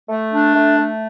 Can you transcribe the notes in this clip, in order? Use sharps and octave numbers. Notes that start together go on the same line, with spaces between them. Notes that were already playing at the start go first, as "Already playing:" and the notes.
A3
D4
A3
A3